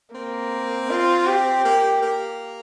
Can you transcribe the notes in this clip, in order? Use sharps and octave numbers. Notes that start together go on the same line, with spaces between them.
A#3 C4
F4
G4
A#3
A#3